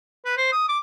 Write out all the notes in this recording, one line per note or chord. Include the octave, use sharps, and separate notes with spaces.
B4
C5
D#6
D6